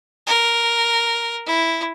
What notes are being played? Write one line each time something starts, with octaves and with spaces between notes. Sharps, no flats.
A#4
E4